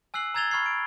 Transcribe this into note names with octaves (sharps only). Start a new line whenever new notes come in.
G#5 E6 F#6 C7 F#7
A#5 E6 G#6 A6 F7 G7
B5 C#6 F6 G#6 C7
D7